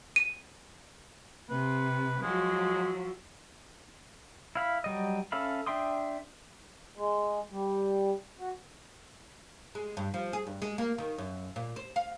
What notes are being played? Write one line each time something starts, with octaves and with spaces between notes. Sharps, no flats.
D#7
C3 B4
F3 F#3 G#3
E4 F5 B5
F#3 G3 D#5
C#4 A4 E5 F5 B5
D4 E5 G5 C6 D#6
G#3
G3
F#4
G#3
G2
F3
G#4
G2
G#3
A#3
D#3
F#2
A#2
C5
F5